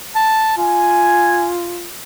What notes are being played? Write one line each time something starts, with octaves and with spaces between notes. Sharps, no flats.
A5
F4 G#5